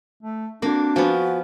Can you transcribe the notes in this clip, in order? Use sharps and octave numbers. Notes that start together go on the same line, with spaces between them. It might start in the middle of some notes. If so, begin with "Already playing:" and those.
A3
A#3 C4 D4 F#4
F3 B3 F#4 F5 G#5 A6